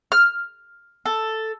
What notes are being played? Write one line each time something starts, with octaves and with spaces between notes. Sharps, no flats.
F6
A4